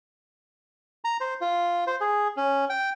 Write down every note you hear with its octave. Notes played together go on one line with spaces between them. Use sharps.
A#5
C5
F4
C5
G#4
C#4
G5